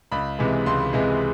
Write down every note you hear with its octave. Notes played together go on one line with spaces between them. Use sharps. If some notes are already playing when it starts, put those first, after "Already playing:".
C#2 B5
C3 E3 G#3
C#2 C6
C3 E3 G#3